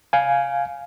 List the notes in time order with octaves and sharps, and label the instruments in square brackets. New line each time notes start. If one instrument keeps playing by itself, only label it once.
[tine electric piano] F5 G#5